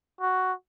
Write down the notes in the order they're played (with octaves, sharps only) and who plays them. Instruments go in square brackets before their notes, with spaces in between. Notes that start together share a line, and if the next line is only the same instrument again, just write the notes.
[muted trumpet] F#4